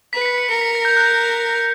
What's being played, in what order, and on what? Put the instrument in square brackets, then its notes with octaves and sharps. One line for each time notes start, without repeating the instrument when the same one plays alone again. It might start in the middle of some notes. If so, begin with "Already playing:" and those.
[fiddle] B4 [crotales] B6
[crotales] C#7
B6
C#7
[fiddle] A#4 [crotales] C#7
[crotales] B6
A#6
G6
F#6